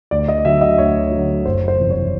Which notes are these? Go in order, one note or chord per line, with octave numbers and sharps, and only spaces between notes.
D2 D5
D#5
D3 F#3 E5
D#5
D2 C#5
D3 F#3
F#1 C5
C5
E2 C3 F3
C#5